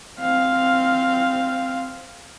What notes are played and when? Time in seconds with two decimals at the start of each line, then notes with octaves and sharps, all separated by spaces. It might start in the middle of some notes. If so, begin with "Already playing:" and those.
0.20 C4 F5